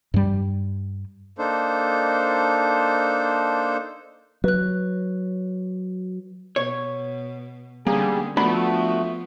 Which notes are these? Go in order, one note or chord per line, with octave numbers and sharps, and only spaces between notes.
G2 G3
A#3 D4 D#4 A4 C5
F#3 B4 F#6
B2 C#5
D3 G3 A#3 B3 C#4 G#4
F3 A3 B3 D4 F#4 B5